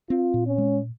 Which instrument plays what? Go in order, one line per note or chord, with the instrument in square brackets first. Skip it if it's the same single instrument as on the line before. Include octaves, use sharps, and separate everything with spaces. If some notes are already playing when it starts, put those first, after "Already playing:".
[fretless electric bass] C4 [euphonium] F4
[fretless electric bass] A#2
[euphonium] C#4
[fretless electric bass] G#3